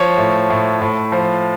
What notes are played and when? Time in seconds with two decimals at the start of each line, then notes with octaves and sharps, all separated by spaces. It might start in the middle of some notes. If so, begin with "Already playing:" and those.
Already playing: F3 C#5
0.18 A2
0.50 A2
0.82 A2
1.12 F3